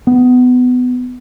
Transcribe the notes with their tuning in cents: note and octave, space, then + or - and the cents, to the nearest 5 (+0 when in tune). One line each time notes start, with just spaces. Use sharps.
B3 +20